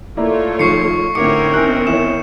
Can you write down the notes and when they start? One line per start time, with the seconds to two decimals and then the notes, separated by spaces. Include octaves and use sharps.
0.17 A3 A#3 E4 F4 C#5 D5
0.59 D#3 F3 C#6 C7 C#7
1.15 A2 D3 C4 D#4 A#4 C#5 D6 C#7
1.54 D#3 B3 C#4 E4 F#6
1.87 E3 C#5 E7